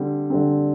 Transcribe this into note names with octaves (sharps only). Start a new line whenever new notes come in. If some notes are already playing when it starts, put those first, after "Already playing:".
Already playing: D3 G3 C4
D3 G3 C4